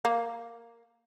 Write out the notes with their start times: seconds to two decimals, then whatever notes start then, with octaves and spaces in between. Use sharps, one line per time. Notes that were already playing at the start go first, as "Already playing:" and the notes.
0.05 A#3